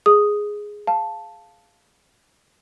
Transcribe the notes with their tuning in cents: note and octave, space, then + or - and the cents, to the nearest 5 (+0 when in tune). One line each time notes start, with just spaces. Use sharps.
G#4 +0 D#6 +0
F5 +0 A5 +0